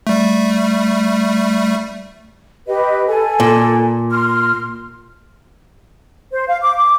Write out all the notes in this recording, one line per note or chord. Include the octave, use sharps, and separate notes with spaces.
G3 A3
G4 B4 D#5
A4 G#5
A#2
C6 F6
C5
F5
D6
D6